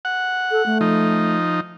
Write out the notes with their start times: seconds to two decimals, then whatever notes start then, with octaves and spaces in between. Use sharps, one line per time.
0.05 F#5
0.51 A4
0.66 A3
0.81 F3 D#4